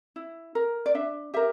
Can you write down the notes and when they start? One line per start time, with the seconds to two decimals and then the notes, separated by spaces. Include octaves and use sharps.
0.16 E4
0.55 A#4
0.86 D5
0.95 D4 E5
1.34 G4 A#4 E5